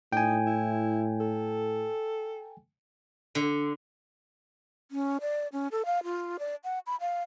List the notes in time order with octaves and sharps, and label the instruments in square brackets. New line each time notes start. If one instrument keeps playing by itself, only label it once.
[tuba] A2 [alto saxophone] D#4 [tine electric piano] G5 G#5
[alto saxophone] E4
A4
[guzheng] D3
[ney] C#4
D5
C#4
A4
F5
F4
D5
F#5
B5
F5